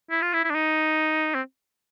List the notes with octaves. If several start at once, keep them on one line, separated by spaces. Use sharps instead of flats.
E4
F4
E4
E4
D4
D#4
C4